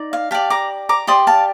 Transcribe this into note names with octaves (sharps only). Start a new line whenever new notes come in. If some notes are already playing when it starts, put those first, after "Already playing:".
Already playing: D#4 D5
F5
G4 D5 F5 A5
A#5 D6
A#5 D6
G4 D5 C6 D#6
F5 A5